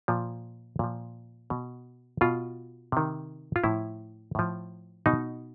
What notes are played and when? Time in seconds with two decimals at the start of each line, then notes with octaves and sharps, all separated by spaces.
0.08 A#2 F3
0.79 A#2 F3
1.50 B2
2.21 B2 F4
2.92 C3 D#3
3.56 F4
3.64 A2 F3 E4
4.35 A2 F3
5.06 B2 D#4